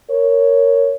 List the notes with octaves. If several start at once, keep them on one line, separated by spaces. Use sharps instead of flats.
A#4 C#5